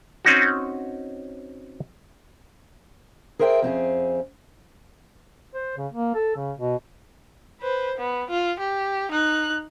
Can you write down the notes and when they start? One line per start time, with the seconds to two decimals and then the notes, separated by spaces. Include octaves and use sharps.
0.25 C4 C#4 D#4 F#4
3.39 G#4 A#4 C5 E5 F#5 G5
3.62 F2 C4 C#4 G#4
5.55 C5
5.77 C#3
5.92 A#3
6.15 A4
6.36 C#3
6.57 B2
7.61 B4 C5
7.97 B3
8.30 F4
8.60 G4
9.11 D#4 F#6